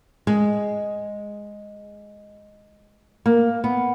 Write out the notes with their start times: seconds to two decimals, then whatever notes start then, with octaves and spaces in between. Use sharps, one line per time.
0.27 G#3
3.26 A#3
3.64 B3